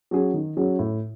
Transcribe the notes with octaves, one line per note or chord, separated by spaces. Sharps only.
F#3 C#4 G#4
D#3
F#3 C#4 G#4
A2